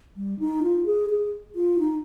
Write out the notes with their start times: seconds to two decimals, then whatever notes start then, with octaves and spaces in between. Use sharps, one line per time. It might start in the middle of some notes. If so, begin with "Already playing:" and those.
0.17 G3
0.40 D#4
0.63 F4
0.86 G#4
1.10 G#4
1.55 F4
1.79 D#4